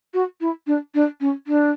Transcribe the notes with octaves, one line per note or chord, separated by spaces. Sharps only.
F#4
E4
D4
D4
C#4
D4